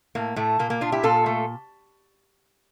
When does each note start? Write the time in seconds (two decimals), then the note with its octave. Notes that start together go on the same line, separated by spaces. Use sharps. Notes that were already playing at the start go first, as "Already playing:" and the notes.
0.15 A2 A#3
0.36 A2 A3
0.59 A#2 A#3
0.70 A#3
0.81 A#2 D4 F4
0.92 E4 G4
1.03 A#2 F4 A4
1.26 A3